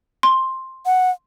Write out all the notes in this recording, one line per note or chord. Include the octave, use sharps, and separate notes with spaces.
C6
F#5